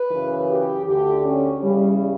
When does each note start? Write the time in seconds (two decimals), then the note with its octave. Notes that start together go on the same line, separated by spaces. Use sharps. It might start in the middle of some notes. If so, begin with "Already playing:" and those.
Already playing: B4
0.09 F#2 C#3 E3
0.47 G4
0.85 D2 D3 G4
1.25 C#4
1.63 E2 C#3 E3 G3